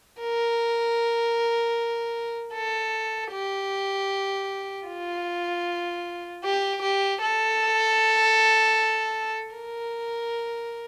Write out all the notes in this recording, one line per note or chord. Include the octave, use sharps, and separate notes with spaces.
A#4
A4
G4
F4
G4
G4
A4
A#4